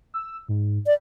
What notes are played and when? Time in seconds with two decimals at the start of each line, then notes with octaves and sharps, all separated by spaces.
0.14 E6
0.48 G#2
0.86 D5